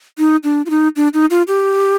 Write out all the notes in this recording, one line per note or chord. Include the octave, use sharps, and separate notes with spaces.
D#4
D4
F4
D#4
D4
D#4
F4
G4